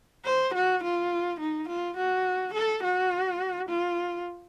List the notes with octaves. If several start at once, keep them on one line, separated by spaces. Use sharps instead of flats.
C5
F#4
F4
D#4
F4
F#4
A4
F#4
F4